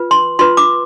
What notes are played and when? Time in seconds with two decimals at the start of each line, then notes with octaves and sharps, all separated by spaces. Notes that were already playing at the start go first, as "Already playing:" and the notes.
Already playing: F4 B4
0.11 C6
0.39 F4 B4 C6
0.57 D6